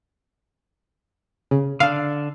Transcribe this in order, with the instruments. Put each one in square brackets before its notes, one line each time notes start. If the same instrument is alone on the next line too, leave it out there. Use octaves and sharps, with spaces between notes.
[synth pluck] C#3
[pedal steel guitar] D3 D4 [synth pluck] F5